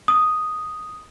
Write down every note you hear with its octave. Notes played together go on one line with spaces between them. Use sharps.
D#6